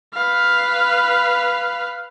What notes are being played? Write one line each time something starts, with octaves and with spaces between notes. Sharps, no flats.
B4 F5